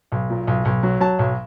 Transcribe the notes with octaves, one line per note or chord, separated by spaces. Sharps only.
B1
A#2
B1
B1
F#3
F#3 A5
B1